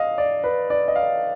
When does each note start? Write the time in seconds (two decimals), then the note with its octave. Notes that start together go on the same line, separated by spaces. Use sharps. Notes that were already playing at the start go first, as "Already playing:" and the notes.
Already playing: D#5 F5
0.18 D5
0.44 B4
0.70 D5
0.88 D#5
0.96 F5